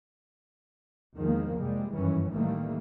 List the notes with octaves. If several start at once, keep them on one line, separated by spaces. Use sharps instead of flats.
E2 D#3 F3 G#3 A#3
F2 C3 G3 G#3
F#1 G2 D#3 E3 C#4
A1 D#3 E3 G3 A3 A#3